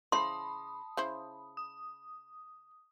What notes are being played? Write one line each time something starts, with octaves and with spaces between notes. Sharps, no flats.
C#3 E4 C5 A5 B5 C6 D#6
C#3 E4 C5
D#6